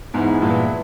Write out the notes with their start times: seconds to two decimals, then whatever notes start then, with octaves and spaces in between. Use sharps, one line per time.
0.13 E2 G#2 E3 G#3 B3 E4
0.42 G2 A#2